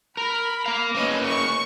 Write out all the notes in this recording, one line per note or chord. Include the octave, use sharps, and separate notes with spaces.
A#4 B5
A#3 F5
A#3 C#4 B4 D#5
C#6